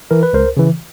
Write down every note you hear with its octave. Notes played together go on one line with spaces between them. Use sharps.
E3 A#4
B4
C#2 A#4 C5
C#3 E3